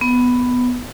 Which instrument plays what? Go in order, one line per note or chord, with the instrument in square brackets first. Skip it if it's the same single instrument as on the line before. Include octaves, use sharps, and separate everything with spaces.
[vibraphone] B3